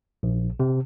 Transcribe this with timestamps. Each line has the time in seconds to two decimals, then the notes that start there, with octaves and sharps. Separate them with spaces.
0.23 A#1
0.60 C3